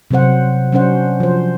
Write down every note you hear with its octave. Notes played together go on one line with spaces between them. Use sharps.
C3 F#3 C4 C5 F#5
F#3 C#4 D4 C5 F#5
F3 C5